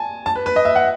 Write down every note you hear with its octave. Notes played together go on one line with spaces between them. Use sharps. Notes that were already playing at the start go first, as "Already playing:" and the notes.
Already playing: G#5 A5
A5
B4
B4
D#5
E5
F#5